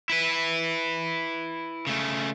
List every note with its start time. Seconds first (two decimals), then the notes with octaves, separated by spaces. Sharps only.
0.10 E4 B4
1.87 C#3 A3